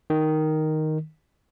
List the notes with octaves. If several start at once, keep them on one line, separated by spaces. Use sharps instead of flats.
D#3